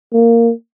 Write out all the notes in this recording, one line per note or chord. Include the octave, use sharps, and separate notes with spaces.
A#3